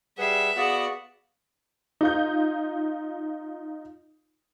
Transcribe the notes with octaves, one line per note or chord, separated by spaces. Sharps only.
G3 G#4 B4 E5 F#5 C7
B3 F#4 G#4 D5 F5 F#5 D#6
D#4 F4 G6